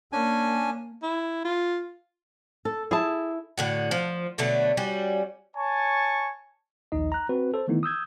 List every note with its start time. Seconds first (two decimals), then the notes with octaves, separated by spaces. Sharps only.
0.13 A#3 C#4 D4 G#5
1.03 E4
1.45 F4
2.65 A4
2.91 E4 G#4 A5
3.58 A2 D3 F#4
3.91 F3
4.38 B2 D3 F#3 A3
4.77 G3 C#4 F#4
5.56 C#5 G#5 A5 C#6
6.92 A#1 D#2 D#4 D#5
7.12 A#5 F#6
7.29 C4 F#4 B4
7.54 A4 C5
7.68 D#3 E3 A3 B3 D#4 E4
7.83 D#6 E6 G6 G#6